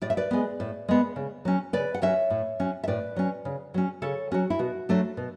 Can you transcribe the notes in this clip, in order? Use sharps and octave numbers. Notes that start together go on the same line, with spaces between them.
A2 D5
E5
B4 D5
G#3 B3
A2
G#3 B3
C#3
F#3 C#4
C#3 B4 D5
F#5
F#3 C#4 C#5 E5
A2
F#3 C#4
E5
A2 B4 D5
F#3 C#4
C#3
F#3 C#4
C#3 A4 C#5
F#3 C#4 F#4
E4
B2 F#4
F#3 A3 D4
B2